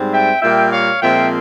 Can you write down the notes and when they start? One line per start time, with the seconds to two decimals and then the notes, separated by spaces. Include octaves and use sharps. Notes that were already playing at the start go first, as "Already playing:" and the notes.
Already playing: G#2 G3 C4
0.12 E5 G5
0.42 A#2 G3 A#3 E5 G5
0.71 C#5 F5
1.01 A#2 F3 G#3 C4 E5 G5